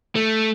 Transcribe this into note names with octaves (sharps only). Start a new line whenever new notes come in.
A3